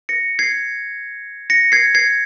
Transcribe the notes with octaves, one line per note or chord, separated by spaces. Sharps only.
A#6 C#7
G#6 C7
A#6 C#7
G#6 C7
G#6 C7